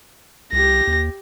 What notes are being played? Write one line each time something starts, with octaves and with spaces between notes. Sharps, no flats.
C2 G4 A#6
D#2